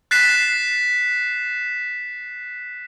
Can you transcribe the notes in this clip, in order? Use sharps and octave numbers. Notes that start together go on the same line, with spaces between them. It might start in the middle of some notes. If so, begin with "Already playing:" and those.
F#6 A6 B6 C7 E7